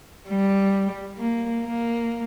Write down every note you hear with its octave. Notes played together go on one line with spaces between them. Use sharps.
G3
A#3
A#3